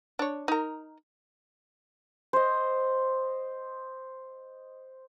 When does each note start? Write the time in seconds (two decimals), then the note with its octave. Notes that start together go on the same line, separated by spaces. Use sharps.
0.19 D4 C#5
0.48 D#4 A#4
2.33 C5 D#5